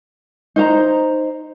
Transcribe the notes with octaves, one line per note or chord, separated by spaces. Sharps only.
D#4 C5 A#5